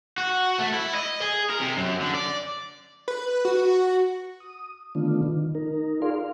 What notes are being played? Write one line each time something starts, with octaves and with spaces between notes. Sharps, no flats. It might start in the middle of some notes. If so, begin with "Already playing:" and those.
F#4
A3
E4
D#5
G#4
A#4
C3
F#2
D3
D5
B4
F#4
D#6
D3 D#3 A3 B3 D4 F4
D#3
D#4 A#4
F4 G#4 A#4 D5 F5 C6
F5